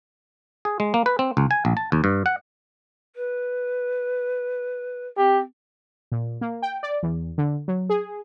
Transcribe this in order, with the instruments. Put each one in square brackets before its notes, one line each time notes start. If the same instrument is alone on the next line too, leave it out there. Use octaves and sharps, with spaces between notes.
[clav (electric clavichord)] G#4
G#3
A#3
B4
C4
C#2
G#5
A#1
A5
D#2
G2
F#5
[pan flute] B4
[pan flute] C4 [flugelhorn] G4
[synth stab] A#2
A#3
G5
D5
E2
D3
F#3
G#4